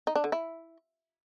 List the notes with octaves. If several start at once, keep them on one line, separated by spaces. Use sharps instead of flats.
D#4
D4
D3
E4